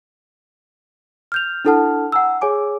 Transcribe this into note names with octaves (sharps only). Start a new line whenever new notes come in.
F6 G6 F7
D4 E4 A4 F#5 A5 F6
F#5 G#5 A#5 E6
G#4 C#5 G#5 D6